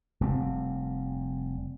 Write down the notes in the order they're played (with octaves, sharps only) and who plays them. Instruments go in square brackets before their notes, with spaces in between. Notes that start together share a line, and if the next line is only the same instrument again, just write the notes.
[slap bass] F1 G3 C4